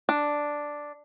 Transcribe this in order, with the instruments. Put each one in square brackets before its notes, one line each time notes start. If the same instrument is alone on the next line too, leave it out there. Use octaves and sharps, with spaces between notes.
[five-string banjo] D4